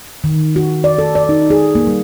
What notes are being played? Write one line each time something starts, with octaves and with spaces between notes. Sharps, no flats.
D#3
F#4
D5
A4
D5
D#4
G#4
A#3
G3